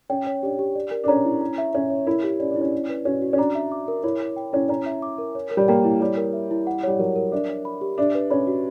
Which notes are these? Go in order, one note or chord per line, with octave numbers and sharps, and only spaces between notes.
C#4 G5
C#5
D4 G4
G4
D5
A#4
D4
C#4 A#5
E4
A#5
E5
C#4 C#5
C#5
E4 A#4
G4
C#4 D5
D4
E4
C#4
D5
B4
C#4 F#4
F#4
C#4
D4 A#5
E5
D6
A#4
E4 C#5
A#4
G5
C#4 E4
C#4 A#5
E5
D6
A#4
C#5
A#4
G3
A#3 G5
E4
G3 C#5
A#4
E5
E4
F#5
G3 C#5
F#3 A#4
A#4
D4 E5
C#5
B5
G4
D4 E5
B4
C#4 B5
F#4